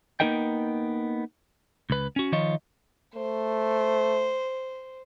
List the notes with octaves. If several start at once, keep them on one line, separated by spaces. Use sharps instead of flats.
A#3 B3 D#4 A#4 D#5 G5
C#2 B4
C#4 F#4
D#3 F3 F4 C#5 D#5
A3 C5